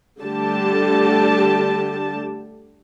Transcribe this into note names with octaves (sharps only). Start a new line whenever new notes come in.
D3 G3 A3 G4 A5